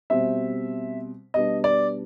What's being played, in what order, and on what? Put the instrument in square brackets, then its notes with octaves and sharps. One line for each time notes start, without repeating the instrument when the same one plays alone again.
[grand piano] B2 G3 C4 [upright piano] E5
[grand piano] B2 G3 B3 D4 [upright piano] D#5
[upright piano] D5